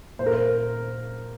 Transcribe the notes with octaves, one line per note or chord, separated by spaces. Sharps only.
A#2 C5
A#4
C5